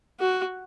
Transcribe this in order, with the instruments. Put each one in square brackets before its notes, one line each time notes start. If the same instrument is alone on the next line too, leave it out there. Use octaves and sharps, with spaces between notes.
[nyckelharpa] F#4